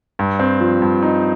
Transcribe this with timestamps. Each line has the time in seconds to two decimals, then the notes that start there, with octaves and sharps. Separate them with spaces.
0.19 G2
0.39 C4
0.61 F3
0.82 G2
1.02 D#4